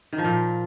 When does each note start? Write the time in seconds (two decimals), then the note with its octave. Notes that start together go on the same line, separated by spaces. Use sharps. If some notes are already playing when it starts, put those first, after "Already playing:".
0.13 D#3
0.18 F3
0.24 A#2